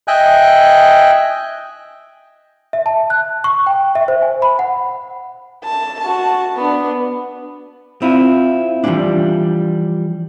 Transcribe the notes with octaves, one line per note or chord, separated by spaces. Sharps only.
D#5 E5 G5 G#5 F#6
E5
A5
F#6
C#6
G5
E5
C5
G#5
B5
F#5
A5
F#4 A5
B3 D4
C4 E4 F4
E3 F3 G3 A#3 C#4 D4